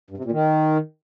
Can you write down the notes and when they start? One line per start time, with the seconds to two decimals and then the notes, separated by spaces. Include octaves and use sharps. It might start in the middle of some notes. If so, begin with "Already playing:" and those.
0.10 G2
0.18 C3
0.25 A#2
0.32 D#3